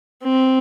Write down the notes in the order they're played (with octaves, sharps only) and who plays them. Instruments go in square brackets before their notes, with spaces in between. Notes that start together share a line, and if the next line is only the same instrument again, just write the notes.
[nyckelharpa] C4